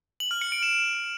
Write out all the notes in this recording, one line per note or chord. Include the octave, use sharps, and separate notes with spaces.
F#7
F6
C#7
D7
E7